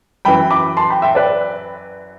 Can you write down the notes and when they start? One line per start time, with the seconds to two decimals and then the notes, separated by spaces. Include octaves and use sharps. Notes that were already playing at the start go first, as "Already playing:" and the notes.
0.25 F#2 E3 G5 B5
0.51 B5 D6
0.77 A5 C6
0.90 G5 B5
1.02 E5 G5
1.15 B4 D5